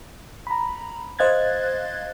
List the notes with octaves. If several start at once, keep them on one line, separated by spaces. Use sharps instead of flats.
A#5 B5
C5 D#5 F5 F#6 G#6 A6